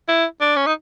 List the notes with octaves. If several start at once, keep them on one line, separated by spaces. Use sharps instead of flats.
E4
D4
C#4
D#4